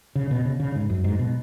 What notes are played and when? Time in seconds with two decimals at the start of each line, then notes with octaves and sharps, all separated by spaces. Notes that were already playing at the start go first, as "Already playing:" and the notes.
0.15 C#3
0.31 B2
0.45 C#3
0.60 C#3
0.76 G#2
0.90 F#2
1.04 G#2
1.19 B2